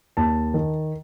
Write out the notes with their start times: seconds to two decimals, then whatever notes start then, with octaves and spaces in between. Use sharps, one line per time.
0.17 D#2 A5
0.54 D#3